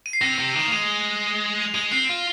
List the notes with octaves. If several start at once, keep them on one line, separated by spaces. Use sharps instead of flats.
D#7
C7
C3 A#6
C3
D#3 F7
A#3
G#3 D#7
F7
G#3 D#7
C4 C7
F4